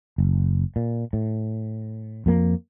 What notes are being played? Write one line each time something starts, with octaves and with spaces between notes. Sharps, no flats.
F#1
A#2
A2
F2 F3 A#3